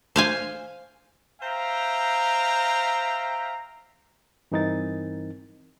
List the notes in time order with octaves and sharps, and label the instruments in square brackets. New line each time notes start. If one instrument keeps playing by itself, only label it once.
[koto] C5 F5 G#5
[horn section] C5 E5 F5 G5 A#5
[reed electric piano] G2 E3 C4 D#4 A#4 A6